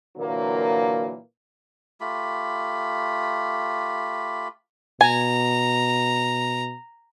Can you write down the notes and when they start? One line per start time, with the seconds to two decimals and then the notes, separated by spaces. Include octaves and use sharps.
0.17 A#2 D3 E3 F#3 A#3
2.01 A3 F4 G4 B5
5.01 B2 G#5 A#5